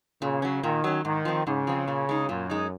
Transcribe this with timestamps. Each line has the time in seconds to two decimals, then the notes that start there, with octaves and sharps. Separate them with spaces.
0.22 A#2 C#3
0.42 F#3 C#4
0.63 A#2 D#3
0.84 F#3 C#4
1.04 G#2 D#3
1.25 F3 C4
1.46 G#2 C#3
1.67 F3 C4
1.88 A#2
2.09 G#3 D#4
2.29 F#2 A#2
2.50 G#3 D#4